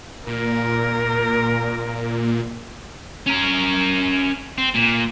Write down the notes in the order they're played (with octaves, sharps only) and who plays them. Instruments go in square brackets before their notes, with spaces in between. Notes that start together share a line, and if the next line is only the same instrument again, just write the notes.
[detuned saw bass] A#2 [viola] A#4
[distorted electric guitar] C#4 A#4
C4
A#2